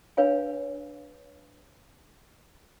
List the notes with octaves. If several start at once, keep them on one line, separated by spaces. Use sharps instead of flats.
D4 B4 C#5 F5 G#5